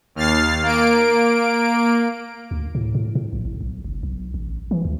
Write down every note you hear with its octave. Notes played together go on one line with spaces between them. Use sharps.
D#2 F6 A6 C7
A#3 D7
D2
A2
A2
A2
A#1
G#1
B1
F#1
B1
A1
E3
D2